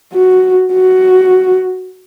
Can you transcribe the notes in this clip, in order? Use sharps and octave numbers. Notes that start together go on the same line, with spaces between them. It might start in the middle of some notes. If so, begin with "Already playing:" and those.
F#4
F#4